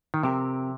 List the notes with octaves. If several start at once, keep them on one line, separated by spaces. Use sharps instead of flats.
D#3
F2 C3 F3 C4 G4 A#4